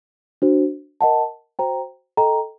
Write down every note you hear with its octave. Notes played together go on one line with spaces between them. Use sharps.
D4 F#4 C5
A#4 D#5 F#5 A5
F#4 C5 G5 A#5
A4 D#5 G5 A#5